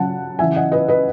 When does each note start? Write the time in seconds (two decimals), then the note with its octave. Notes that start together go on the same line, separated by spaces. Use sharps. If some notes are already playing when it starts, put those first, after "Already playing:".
Already playing: C#3 F#3 F#5 A5
0.39 C#3 E3 E5 G#5
0.56 D#5 F#5
0.72 B4 D#5
0.88 B4 D#5